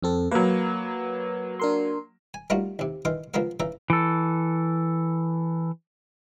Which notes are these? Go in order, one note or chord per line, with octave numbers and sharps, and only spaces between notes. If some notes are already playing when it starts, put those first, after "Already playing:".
F2 C4 A4
F#3 A#3 B4
D4 A#4 C6
G#5
G3 A3 A#3 D#4 F4 F#4
D#2 C3
D#3 E3 F5 C6
C#2 F3 A#3 B3 A#4 F5
C#3 E3 E5 A#5
E3 A4